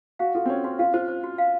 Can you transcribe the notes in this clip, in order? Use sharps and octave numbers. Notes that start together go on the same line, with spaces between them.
F#4 F5
F4 A4
C4
C#4 F#4
C#4 F#4
F4 F5
F4 C5
C5
F#4
F5